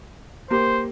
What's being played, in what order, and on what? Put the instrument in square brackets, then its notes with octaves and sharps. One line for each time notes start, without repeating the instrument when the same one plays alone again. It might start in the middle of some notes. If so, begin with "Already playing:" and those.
[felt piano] A#3 G4 [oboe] C5